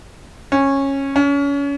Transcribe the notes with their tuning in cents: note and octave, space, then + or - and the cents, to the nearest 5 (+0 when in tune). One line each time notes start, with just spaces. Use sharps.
C#4 -15
C#4 +30